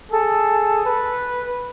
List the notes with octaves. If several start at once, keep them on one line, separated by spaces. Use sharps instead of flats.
G#4 A4
B4